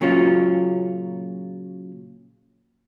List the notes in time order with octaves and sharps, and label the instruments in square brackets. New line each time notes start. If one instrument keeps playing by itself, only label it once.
[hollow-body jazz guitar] A#2 C#3 F#3 C#4 F4